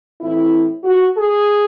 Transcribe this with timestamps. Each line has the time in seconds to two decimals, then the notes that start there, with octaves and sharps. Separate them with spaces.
0.21 A2 E3 C4 E4
0.84 F#4
1.16 G#4